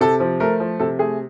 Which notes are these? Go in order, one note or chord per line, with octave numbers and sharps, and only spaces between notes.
C3 A4
F3
A3 A#4
F3
C3 A4
A3 G#4